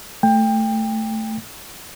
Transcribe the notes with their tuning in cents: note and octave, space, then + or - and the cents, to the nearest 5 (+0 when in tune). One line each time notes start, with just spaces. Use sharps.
A3 +0 G5 +20